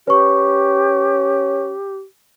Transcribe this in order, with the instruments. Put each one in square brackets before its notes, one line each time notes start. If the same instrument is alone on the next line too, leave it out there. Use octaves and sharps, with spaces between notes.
[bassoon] C#4 [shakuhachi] G4 [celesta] B4 C#6